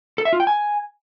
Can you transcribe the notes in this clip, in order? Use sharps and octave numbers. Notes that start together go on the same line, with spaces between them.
A4
E5
F4
G5
G#5